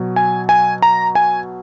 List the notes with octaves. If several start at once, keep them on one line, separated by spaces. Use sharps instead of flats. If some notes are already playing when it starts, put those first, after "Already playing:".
Already playing: B2 F#3
G#5
G#5
A#5
G#5